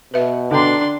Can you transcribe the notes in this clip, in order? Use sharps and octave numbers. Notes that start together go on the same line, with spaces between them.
B2 B4 E5
D3 D4 G5 A#5 C6